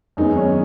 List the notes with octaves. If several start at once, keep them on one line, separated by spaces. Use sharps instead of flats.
F#2 D#3 G#3 B3 D#4
C#4